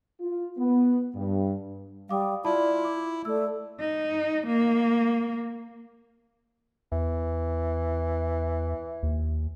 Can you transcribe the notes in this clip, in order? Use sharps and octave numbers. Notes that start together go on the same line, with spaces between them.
F4
B3
G2
G3 F5 D6 D#6
E4 F4 D5 A5 B5
D6
A3 D5 E6
D#4
A#3
E2 E3
D#2